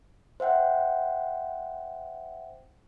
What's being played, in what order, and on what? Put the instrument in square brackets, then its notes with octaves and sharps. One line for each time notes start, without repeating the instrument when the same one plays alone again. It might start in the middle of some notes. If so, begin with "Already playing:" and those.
[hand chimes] C5 E5 F#5 G5